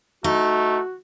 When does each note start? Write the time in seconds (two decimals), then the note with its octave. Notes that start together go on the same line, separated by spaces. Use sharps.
0.24 A3 D#4 F#4